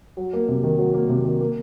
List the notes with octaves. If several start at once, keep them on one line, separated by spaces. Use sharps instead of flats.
F#3
A#3
C3
D#3
F#3
A#3
C3
D#3
A#3